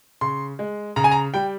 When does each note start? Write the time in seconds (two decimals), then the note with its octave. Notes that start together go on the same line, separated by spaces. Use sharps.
0.21 C#3 C6
0.59 G#3
0.96 C#3 A#5
1.04 G#5
1.11 A#5
1.34 G3 G5